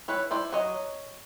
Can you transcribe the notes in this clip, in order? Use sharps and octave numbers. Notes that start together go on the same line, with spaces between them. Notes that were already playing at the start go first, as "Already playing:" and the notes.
E4 B4 C#5
E4 C5 D5
F#3 C#5 D#5